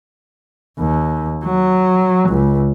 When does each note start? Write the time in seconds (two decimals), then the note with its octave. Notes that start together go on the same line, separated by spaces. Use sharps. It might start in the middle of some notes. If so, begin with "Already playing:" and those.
0.80 D#2
1.45 F#3
2.29 C#2